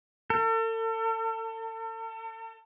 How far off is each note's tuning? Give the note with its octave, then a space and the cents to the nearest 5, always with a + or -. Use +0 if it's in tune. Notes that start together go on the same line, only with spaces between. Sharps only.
A4 +40